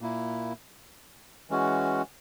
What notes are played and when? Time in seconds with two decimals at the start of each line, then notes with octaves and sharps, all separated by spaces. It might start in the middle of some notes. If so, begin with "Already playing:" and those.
0.01 A#2 A#3 E4
1.50 E3 G#3 C#4 F#4